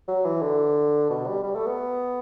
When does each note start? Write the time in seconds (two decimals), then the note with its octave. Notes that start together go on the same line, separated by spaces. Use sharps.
0.08 F#3
0.24 E3
0.42 D3
1.10 B2
1.27 G3
1.43 G3
1.56 A3
1.67 B3